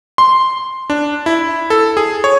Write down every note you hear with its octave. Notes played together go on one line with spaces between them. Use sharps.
C6
D4
E4
A4
G#4
C#5